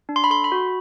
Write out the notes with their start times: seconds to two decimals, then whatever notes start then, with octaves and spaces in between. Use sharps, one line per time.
0.09 D4
0.16 C6
0.24 B5
0.30 A4 C6
0.44 B5
0.52 F#4